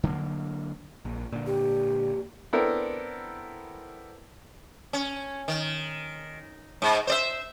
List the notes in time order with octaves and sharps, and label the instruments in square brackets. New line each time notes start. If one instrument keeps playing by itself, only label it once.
[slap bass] D3 F#3 A3 A#3
[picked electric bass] A#1
A#2 D3
[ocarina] G4
[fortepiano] B3 C4 D4 E4 A4 A#4
[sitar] C#4
D#3
G#2
C5 D5 E5